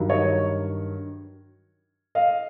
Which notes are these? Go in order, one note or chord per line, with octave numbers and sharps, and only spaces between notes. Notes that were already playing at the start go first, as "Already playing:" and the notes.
Already playing: G2 D#3 F#3
C#5 D#5
D#5 F5